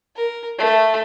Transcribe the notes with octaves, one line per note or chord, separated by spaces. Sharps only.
A#4
A3